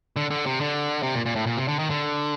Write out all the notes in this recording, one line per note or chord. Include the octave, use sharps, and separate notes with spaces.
D3
D3
C3
D3
C3
A#2
A#2
A2
A#2
C3
D3
D#3
D3